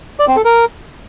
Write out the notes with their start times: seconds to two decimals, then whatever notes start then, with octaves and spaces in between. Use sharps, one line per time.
0.19 D5
0.28 C4
0.36 A4
0.45 A#4